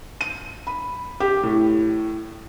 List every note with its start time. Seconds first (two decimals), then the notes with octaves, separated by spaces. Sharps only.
0.21 D#7
0.67 B5
1.20 G4
1.43 A2